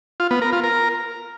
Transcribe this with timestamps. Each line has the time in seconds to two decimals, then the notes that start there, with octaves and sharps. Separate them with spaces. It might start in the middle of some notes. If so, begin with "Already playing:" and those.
0.20 F4
0.31 B3
0.42 A#4
0.53 F4
0.64 A#4